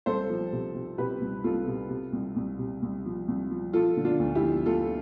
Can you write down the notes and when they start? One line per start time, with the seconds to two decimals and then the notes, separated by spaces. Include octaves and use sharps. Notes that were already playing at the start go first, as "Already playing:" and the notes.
0.06 C2 A4 C5
0.30 F3
0.53 C3
0.75 C3
0.98 C3 G4 B4
1.21 C2
1.44 C2 F4 A4
1.68 C3
1.90 C3
2.13 C2
2.36 C2
2.59 C3
2.82 C2
3.06 F3
3.28 C2
3.51 F3
3.73 F3 F4 A4
3.97 D3
4.05 D4 F4
4.19 D2
4.35 E4 G4
4.43 F3
4.66 D2 F4 A4